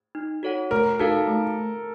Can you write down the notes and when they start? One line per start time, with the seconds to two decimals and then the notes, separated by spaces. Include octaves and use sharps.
0.15 D#4
0.43 F#4 A4 C#5 F#5
0.71 A3 A#4
0.99 D#4 F#4 A4 A#4 F5
1.27 A3